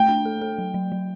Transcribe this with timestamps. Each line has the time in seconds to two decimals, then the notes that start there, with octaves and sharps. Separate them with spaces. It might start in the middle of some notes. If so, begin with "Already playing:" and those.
Already playing: A3 G5
0.09 D4
0.25 A4
0.42 A4
0.59 F#3
0.74 F#3
0.92 F#3